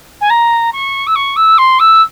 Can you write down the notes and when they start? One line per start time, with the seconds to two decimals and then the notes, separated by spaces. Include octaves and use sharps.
0.21 G#5
0.30 A#5
0.73 C#6
1.07 E6
1.15 C#6
1.36 E6
1.58 C6
1.79 E6